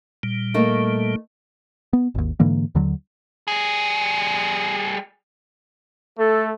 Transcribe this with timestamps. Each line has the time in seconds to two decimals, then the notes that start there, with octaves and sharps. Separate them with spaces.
0.23 A#2 G3
0.54 A3 A#3 D#4
1.93 B3
2.15 G#1 D#2
2.40 G#2 D3 E3 A#3
2.75 D#2 D3 F#3
3.48 G3 G#4
6.19 A3 A4